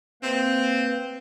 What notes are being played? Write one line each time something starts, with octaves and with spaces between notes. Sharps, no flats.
A#3 C4 B4 F5